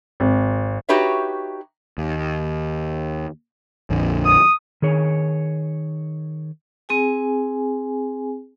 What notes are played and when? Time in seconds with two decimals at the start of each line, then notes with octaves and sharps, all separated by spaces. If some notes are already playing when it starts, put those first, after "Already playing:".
0.20 G#1
0.89 D#4 F#4 G4 B4 C#5 E5
1.98 D#2
3.90 A#1 F2 D3
4.25 D#6
4.82 D#3 G#4 C#5
6.89 C4 G#4 G#5